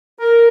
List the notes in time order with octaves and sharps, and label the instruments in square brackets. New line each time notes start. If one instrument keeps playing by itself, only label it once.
[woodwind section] A#4